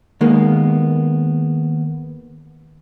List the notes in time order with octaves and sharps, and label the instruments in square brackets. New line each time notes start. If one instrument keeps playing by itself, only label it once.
[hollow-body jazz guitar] D#2 D#3 G#3 A#3 B3